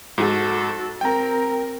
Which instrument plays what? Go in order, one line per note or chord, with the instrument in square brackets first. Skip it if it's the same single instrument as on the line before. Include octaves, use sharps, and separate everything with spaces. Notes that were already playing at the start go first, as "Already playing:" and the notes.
[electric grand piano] G#2 [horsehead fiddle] F#4 A4
[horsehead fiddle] C4 A#4 [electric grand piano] G5 A#5